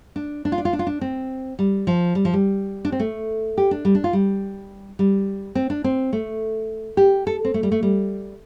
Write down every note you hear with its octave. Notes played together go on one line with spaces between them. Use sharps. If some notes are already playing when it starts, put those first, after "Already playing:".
D4
D4
F4
D4
F4
D4
F4
D4
C4
G3
F3
G3
F3
G3
D4
C4
A3
G4
D4
G3
D4
F4
G3
G3
C4
D4
C4
A3
G4
A4
C4
A3
G3
A3
G3